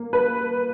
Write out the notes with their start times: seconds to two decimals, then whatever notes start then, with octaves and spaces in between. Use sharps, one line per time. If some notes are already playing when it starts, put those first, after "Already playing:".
Already playing: A#3
0.13 B4